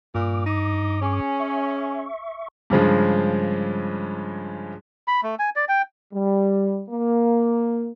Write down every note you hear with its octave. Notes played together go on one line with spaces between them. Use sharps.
G2 A#2 D6
D#4
C#4 G#4
E5 C#6
G2 C#3 F3 G#3
B5
A3
G#5
D5
G5
G3
A#3